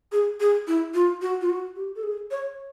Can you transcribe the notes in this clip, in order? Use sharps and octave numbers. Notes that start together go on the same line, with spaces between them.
G#4
G#4
E4
F4
F#4
F4
F#4
G4
A4
G#4
C#5